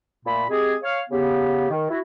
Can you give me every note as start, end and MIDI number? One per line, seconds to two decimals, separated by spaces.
0.25 0.43 46
0.25 0.43 57
0.25 0.43 83
0.49 0.74 56
0.49 0.74 60
0.49 0.74 67
0.49 0.74 68
0.83 1.00 73
0.83 1.00 77
1.10 1.66 49
1.10 1.66 59
1.10 1.66 67
1.70 1.87 51
1.89 1.98 64
1.89 1.98 66